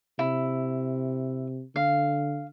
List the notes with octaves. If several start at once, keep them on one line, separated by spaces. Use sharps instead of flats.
C3 E4
D3 F5